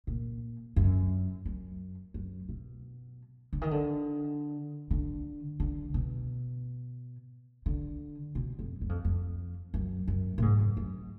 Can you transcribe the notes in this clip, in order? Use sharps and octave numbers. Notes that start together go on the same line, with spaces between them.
A#2
F#2
F#2
F#2
B2
D3
D#3
D3
D3
D3
B2
D3
B2
F2
F#2
F2
F2
F#2
F#2
A#2
G#2
F#2
F#2